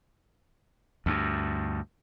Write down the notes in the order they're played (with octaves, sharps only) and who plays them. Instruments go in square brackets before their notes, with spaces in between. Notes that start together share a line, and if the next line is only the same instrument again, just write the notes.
[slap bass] D2 G2